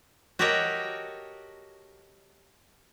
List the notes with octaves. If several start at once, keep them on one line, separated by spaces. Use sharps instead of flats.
F#4 G4 A4 A#4 C#5 D#5